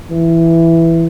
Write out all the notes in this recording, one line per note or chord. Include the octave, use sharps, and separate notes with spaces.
E3